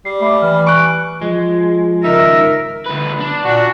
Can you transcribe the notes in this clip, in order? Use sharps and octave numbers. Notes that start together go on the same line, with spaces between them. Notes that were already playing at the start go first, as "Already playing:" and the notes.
G3 C7
A3 B5 D6
E3 F6
G#5 C#6 F#6 D7
F3 G#3
C#2 D#3 D#4 A#4 E5
D2 B4
D4
A#2 F#4